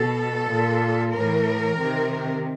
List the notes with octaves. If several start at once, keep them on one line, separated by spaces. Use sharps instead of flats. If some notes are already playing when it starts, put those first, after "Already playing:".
Already playing: B2 A4
A#2
A2 E3 A#4
C3 D#3